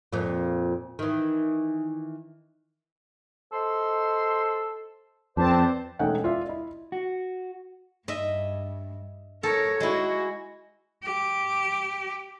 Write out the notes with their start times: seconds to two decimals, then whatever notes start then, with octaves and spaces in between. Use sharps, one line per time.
0.13 F2 A#2
0.99 D#3 E3
3.52 A4 C5 D#5 C6
5.37 F2 C4 B4 C5 D5 A5
5.99 E1 A3 C#4 D#4 F#5 G5
6.24 F4 D5 E5
6.47 E4 D#5
6.92 F#4
8.08 G2 D#5 E5
9.43 A4 A#4 C#5
9.80 G#3 E4 F#4
11.03 G4